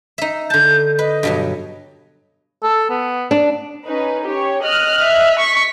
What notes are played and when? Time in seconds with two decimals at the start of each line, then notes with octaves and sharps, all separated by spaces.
0.18 D#4 E5
0.50 D3 A5 G6
0.99 B4 D#5
1.23 G2 B2 F#3
2.63 A4
2.90 B3
3.31 D4
3.85 C#4 D#4 B4
4.25 G4 C#5
4.62 D#5 F6 F#6
5.01 E5
5.39 C#6 B6